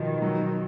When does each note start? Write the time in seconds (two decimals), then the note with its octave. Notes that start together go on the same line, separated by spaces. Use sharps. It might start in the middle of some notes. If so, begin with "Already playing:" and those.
Already playing: B2 D#3 F3
0.22 F#3